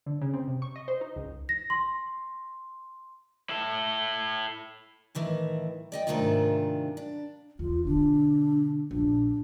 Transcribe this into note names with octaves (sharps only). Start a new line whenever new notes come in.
D3
C#3
C4
C3
C#6
D#5
C5
D#4
C#2
A#6
C6
E4 A4
A2 D#3 E3
D5 D#5 G5
G#2 C3 D#3 A3 D4 F4
D4
E2 F4
B2 D3 D4
A#1 D4